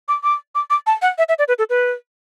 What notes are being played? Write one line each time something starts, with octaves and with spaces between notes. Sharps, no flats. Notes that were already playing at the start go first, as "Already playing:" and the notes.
D6
D6
D6
D6
A5
F#5
E5
E5
D5
B4
A4
B4